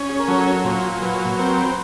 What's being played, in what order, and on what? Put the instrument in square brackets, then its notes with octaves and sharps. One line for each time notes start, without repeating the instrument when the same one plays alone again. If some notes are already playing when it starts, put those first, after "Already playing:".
Already playing: [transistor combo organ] C#4
[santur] G#4
A#4
[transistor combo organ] F#3 [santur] A4
[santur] A#4
[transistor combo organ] A#2 [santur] C5
[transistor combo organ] F#3 [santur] B4
[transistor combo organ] C4 [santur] A#4
[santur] C5
B4